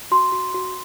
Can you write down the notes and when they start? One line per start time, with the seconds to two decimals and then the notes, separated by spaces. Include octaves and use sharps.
0.11 F#4 C6
0.32 F#4
0.54 F#4